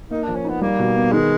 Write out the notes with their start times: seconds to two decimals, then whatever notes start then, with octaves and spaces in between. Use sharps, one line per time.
0.10 A#3 D#4
0.23 F3 D4
0.36 C#4
0.45 B3 D#4
0.61 G3 A#3
0.79 B2
0.96 B3
1.12 D#3 G#3